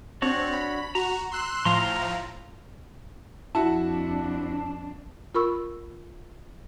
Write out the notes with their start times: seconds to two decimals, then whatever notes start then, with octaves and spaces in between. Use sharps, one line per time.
0.22 C4 D4 F#4 C#5
0.53 B5
0.95 F#4 A#5
1.31 C6 E6 F#6
1.65 A2 F3 F5 A#5 C6
3.55 F2 D4 E4 F#4 A5
5.35 F4 A#4 B5 C#6 E6